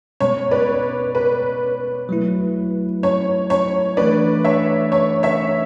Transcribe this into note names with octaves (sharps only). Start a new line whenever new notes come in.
B2 G#3 B3 C#5
B4 D5
B4
F#3 A3 E4
C#5
C#5
E3 A3 D4 B4 D5
C#5 E5
C#5
C#5 E5